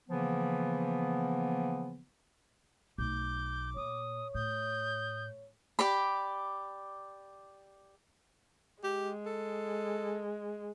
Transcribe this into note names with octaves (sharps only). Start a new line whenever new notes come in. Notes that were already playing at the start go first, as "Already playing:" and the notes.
C#3 E3 F3 A#3 B3
B1 A3 D6 G6
A#2 C#5 D#6
A2 D#6 G6
G4 D5 B5
G#3 G4
A4